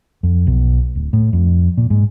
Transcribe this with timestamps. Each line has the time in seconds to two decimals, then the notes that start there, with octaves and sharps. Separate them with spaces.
0.23 F2
0.47 B1
0.95 D1
1.13 A2
1.33 F2
1.78 A#2
1.90 G#2